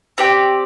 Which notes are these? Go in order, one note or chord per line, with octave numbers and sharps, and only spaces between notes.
C4 G4 D5 G5